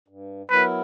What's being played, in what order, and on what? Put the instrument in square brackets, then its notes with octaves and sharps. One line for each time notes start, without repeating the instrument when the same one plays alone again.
[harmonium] G2
[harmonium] F#3 B3 E4 A#4 [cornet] B4